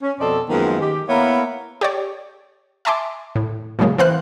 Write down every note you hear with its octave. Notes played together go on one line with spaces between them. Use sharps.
C#4
F2 B2 C4 A4 D5 D#5
F#2 D#3 F3 G#3 A#3 B3
D#3 G4
A#3 B3 E4 A#4 C#5
G4 C#5 D5
E5 G#5 A5 C6 D6
A2
A2 C#3 F#3 G#3 A#3
E3 C4 C5 F5 F#6